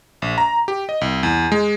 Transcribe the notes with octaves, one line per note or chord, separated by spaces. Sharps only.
A#1
A#5
G4
D#5
C2
E2
G#3